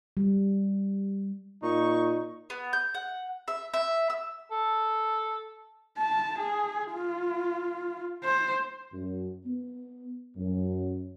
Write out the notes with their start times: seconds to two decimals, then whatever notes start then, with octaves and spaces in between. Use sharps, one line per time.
0.17 G3
1.63 A#2 D#4 C#6
2.50 B3
2.73 G6
2.94 F#5
3.48 E5
3.74 E5
4.10 E6
4.52 A4
5.98 A5
6.39 G#4
6.94 F4
8.24 C5
8.92 F#2
9.45 B3
10.36 F#2